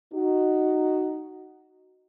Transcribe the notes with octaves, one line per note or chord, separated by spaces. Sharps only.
D#4 F#4